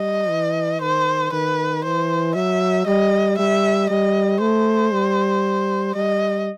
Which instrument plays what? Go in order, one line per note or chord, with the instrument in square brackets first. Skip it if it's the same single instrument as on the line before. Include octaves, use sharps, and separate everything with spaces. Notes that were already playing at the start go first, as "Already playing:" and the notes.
Already playing: [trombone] G3 [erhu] D#5
[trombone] E3
[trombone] D#3 [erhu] C5
[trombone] D#3 [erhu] B4
[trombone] E3 [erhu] C5
[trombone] F#3 [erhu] E5
[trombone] G3 [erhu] D#5
[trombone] G3 [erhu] E5
[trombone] G3 [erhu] D#5
[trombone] A3 [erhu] C5
[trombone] G3
[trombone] G3 [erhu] D#5